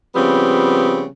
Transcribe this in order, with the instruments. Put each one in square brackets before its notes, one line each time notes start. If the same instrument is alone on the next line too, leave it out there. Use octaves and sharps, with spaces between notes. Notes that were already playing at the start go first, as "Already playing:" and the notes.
[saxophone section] C#3 F3 G3 B3 C4